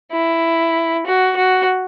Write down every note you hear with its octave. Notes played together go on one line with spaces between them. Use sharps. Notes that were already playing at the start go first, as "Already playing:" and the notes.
E4
F#4
F#4